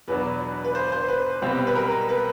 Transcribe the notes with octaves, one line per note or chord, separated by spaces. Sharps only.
E2 B2 F#3 B3 D4 B4
B4
C5
C5
B4
C2 B2 G3 C4
B4
A#4
B4